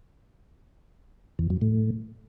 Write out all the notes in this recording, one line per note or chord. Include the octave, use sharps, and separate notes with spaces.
E2
F#2
A2